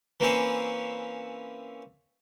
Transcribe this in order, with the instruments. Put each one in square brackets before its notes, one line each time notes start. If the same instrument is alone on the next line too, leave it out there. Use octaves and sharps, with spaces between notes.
[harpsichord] E3 A#3 C4 C#4 E4 C#5